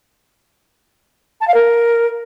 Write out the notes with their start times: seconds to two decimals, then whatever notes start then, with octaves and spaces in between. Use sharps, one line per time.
1.40 A5
1.47 F5
1.54 A#4